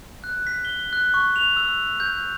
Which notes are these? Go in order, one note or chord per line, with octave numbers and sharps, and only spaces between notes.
F#6
B6
G7
F#6
C#6
F7
E6
G6